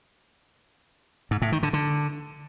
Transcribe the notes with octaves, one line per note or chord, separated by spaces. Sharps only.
G#2
A2
D#3
D3
D3